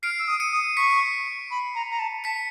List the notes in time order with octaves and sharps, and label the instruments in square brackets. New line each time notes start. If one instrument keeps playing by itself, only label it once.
[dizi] F6 [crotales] C7 D7
[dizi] E6
D#6
[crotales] C#7 D#7
[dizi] D#6
[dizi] C#6 [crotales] B6 C#7
[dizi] B5
A#5
A#5
A5
[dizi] A5 [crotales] B6 C#7